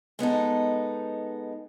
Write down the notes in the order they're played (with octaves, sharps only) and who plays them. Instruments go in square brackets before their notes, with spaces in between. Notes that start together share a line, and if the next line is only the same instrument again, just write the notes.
[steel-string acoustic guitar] G#3 B3 D#4 A4